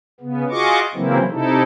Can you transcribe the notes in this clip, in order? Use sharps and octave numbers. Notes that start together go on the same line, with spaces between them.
C#3 B3
F4 F#4 G#4 D#5 C#6 D6
C#3 E3 F#3 A#3 C4 E4
C3 D#4 E4 A4